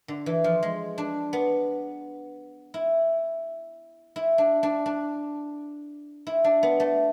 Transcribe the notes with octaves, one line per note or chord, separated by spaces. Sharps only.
D3
E3
F3
G#3
D4
B3
E4
E4
D4
D4
D4
E4
D4
B3
A3